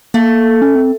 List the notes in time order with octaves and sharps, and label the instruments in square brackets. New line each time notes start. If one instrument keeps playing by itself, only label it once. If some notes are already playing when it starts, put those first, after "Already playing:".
[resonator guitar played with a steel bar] A3 [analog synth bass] A#3
[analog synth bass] C#4
C4